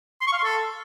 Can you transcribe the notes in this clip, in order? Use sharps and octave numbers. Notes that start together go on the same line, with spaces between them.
C6
C#6
F5
C6
A4